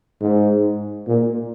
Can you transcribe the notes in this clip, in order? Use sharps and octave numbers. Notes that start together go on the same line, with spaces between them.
G#2
A#2